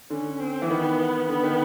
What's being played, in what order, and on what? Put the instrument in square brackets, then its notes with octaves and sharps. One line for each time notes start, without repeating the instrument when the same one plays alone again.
[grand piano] D3 [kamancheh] C#4
[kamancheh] C4
[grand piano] E3
[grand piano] D#3 [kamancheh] B3
[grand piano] D3 [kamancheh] B3
[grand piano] D#3